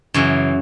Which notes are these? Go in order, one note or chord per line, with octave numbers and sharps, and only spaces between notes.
F#2 C#3 E3